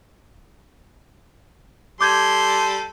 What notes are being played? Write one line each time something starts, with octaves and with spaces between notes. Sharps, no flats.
G3 A4 C6 D6 G6 G#6